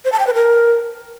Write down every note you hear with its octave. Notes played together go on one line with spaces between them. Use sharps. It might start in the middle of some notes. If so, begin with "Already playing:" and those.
C5
A5
G5
B4
A#4